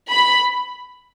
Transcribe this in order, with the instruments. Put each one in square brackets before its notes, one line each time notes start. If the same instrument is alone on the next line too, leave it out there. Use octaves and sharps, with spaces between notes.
[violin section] B5